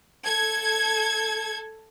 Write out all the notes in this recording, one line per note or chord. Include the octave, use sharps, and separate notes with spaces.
A4 G#6